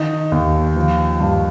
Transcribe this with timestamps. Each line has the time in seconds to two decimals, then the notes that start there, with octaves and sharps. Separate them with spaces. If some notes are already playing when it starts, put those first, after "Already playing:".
Already playing: D#3 D#4
0.32 D#2
0.76 F3
1.20 G2